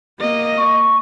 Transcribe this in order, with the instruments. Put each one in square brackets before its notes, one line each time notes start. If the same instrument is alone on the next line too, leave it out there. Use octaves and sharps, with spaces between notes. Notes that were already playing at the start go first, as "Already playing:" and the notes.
[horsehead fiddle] A#3 D#5
[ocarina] C#6